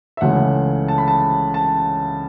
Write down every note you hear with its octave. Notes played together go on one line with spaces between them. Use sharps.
E5
C#2 C#3 E3 A3 F#5
A5
B5
A5
A5